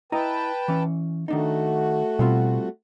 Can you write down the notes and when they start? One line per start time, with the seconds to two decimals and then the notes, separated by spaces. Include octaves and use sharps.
0.12 E4 B4 D#5 G5 A5 A#5
0.68 E3 C#4
1.28 D#3 A3 D4 D#4 F#4
2.19 B2 G3 C4 F4